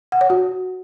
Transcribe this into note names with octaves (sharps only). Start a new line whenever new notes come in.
F#5
C#5
F#4